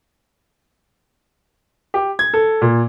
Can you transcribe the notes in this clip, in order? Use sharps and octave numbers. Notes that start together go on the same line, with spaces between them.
G4
G#6
A4
A#2